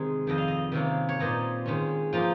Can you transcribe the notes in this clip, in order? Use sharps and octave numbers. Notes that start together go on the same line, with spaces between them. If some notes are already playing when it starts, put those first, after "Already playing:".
Already playing: C3 D#3 G#3 C4 D#4
F2 D#3 G3 D#5
F5
D#5
C3 D#3 G3 A#3 C#4
C#5
A#2 G3 C4 D#4 D#5
D#3 G#3 C#4
F3 A#3 D#4 F4